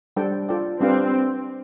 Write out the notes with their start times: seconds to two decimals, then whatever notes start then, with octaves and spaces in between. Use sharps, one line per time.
0.16 G3 D4 A4 C5 G5
0.49 F4 A4 D5 G5
0.80 G3 C4 D4 G4 B4 F5